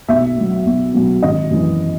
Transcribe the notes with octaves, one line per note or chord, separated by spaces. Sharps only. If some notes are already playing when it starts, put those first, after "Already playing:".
B1 E5
B2 F#3
B1
B2 F#3
G#1 D#5
F#2 E3